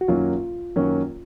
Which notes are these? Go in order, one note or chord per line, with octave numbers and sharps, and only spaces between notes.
F#4
F#2 D#3 F#3 A#3 C#4 F4
F#2 D#3 F#3 A#3 C#4